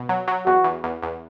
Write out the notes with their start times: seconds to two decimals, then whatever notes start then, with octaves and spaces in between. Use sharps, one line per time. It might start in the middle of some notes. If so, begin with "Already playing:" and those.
Already playing: B2
0.09 F#3
0.28 F#3
0.46 E2 F#4
0.64 E2
0.84 E2
1.03 E2